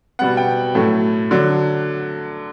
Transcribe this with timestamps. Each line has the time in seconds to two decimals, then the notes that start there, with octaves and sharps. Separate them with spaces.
0.19 B2 G3 B3 F#5
0.37 G5
0.75 A2 F#3 A3
1.31 D3 F#3